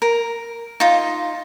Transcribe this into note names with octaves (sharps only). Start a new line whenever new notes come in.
A#4
D#4 F4